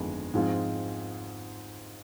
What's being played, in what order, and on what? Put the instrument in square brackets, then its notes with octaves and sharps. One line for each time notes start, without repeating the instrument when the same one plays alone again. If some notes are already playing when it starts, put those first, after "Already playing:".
Already playing: [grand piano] G1 F2 D#3 G#3
G#2 F3 G#3 C4 F4